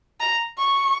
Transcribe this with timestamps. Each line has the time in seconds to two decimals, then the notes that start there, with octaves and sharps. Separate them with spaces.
0.20 A#5
0.58 C#6